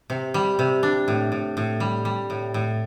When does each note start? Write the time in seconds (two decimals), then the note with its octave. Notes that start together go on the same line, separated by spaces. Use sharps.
0.10 C3
0.34 G3
0.59 C3
0.83 D4
1.08 A2
1.32 A2
1.57 A2
1.80 G3
2.05 G3
2.30 A2
2.54 A2